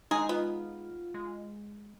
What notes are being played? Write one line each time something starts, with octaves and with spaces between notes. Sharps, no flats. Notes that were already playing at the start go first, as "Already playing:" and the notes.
G#3 D#4 G#4 G#5 A#5
B3 F4
G#3